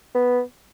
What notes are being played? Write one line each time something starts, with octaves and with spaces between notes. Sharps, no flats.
B3